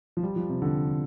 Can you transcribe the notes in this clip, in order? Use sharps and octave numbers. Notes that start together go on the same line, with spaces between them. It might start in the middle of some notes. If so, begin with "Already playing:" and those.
F3
G3
F3
C3
D3